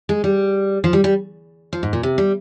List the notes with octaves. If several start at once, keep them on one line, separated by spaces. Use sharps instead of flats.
G#3
G3
F3
G3
G3
F3
G#2
A#2
C3
G3